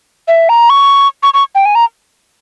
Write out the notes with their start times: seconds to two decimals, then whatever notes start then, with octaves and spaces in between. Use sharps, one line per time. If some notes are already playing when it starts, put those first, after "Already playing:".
0.28 E5
0.49 A#5
0.70 C#6
1.23 C#6
1.34 C#6
1.55 G5
1.65 G#5
1.75 A#5